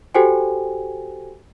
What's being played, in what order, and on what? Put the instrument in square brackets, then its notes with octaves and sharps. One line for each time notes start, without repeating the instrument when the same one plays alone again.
[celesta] F#4 G4 A4 C5 G5 G#5